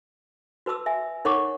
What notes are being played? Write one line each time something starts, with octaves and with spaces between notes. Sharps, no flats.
F#4 B4 A5 D#6 E6
E5 G#5
D#4 A#4 C#5 F#5 C#6 D6